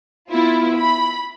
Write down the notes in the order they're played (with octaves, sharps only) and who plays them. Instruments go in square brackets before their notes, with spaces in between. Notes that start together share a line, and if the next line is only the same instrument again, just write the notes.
[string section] B3 E4 F4
B5